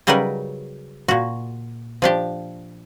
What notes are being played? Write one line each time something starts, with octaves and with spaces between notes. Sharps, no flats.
C#3 F#3 G3 D#4 A#4 B4
A#2 F#4
F3 D4 G4